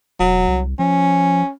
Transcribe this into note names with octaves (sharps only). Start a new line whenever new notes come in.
E1 F#3
C2
F3 C#4